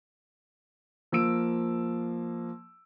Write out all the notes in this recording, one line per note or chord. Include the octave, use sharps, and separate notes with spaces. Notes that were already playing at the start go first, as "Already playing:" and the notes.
F3 A#3 E6 D7